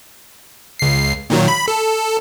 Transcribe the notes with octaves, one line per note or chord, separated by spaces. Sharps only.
C#2 C7
A#2 D#3 F#3
B5
A4